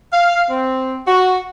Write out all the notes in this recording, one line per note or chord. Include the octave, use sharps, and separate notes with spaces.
F5
C4
F#4